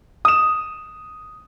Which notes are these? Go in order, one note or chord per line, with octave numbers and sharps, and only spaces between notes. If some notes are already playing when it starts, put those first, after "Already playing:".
D#6 E7